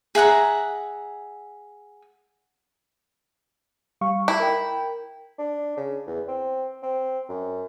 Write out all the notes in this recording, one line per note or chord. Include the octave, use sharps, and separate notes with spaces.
G#4 E5 F#5 A#5
G3 F5 C#6
E4
A#4 G5
D4
C#3
E2
C4
C4
F#2